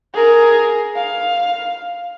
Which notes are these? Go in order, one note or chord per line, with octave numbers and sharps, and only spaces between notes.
G#4 A#4
F5